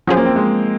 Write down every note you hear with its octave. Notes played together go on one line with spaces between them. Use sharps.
F3 F#3 C#4 G#4 C5
A#3
C4
G#3